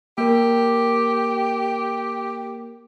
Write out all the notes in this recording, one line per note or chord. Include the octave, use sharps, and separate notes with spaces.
A#3 G4 A#4